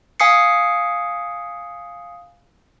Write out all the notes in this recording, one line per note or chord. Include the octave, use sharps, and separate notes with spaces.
F5 G#5 D#6 C7 C#7